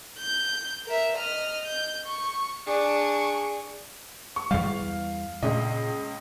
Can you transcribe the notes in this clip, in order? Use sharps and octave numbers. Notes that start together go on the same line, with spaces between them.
G6
A#4 E5
D#5 F6
G6
C#6
D4 G#4 C#6
C#6
E2 G3 F5
C#2 A#2 D#5